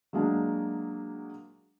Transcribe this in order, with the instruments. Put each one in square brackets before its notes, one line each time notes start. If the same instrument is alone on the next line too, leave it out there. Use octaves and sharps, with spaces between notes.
[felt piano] F#3 G#3 A#3 D4